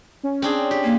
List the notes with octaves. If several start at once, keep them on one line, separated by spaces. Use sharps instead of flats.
C#4
C4 D4 G#4
G4
A#3